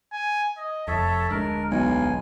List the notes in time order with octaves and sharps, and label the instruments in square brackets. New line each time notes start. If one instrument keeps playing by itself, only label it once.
[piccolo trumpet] G#5
D#5
[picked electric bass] F1 F2 [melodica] A4 C#5 E5 [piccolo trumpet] A5
[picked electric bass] D1 G#3 D4 [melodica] A#4
[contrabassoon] B1 [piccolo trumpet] F5 [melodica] G#5